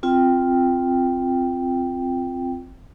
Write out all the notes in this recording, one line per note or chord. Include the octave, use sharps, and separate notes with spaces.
C4 F4 G5